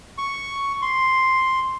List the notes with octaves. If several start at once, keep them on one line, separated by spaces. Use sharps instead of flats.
C#6
C6